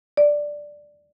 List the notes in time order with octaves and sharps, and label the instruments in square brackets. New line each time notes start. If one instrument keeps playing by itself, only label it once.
[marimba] D5